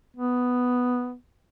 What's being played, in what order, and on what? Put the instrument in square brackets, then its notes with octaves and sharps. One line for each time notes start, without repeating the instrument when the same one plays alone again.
[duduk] B3